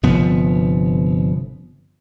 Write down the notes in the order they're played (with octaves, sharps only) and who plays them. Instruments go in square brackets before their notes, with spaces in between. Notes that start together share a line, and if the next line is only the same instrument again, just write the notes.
[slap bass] G1 C3 F3 B3